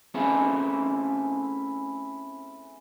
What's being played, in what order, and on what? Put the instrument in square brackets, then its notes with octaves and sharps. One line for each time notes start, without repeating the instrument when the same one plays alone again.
[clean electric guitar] A3 C4 C#4 E4 G#4 A4